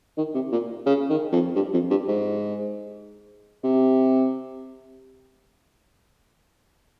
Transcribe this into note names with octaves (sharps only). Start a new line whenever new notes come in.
D#3
C3
A#2
C#3
D#3
F2
G2
F2
G2
G#2
C3